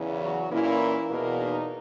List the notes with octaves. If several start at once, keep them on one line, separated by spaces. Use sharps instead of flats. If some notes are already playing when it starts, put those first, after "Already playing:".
Already playing: E2 C#3 E3
F#3 F#4
A#2 E3 A#3 C#4 E4
E2 B2 A#3
D#4